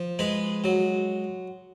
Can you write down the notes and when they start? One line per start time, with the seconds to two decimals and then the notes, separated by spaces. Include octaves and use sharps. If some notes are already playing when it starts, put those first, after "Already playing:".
Already playing: F3
0.19 G#3 B4
0.64 F#3